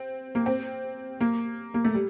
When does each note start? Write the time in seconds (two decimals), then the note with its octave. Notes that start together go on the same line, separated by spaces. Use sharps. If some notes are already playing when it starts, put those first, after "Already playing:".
Already playing: C4
0.35 A#3
0.46 C4
1.21 A#3
1.74 A#3
1.85 A3
1.94 G3